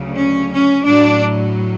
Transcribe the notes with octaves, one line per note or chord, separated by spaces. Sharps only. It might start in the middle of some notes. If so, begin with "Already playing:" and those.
Already playing: D2 C#3 F#3
C#4
C#4
A2 F#3 D4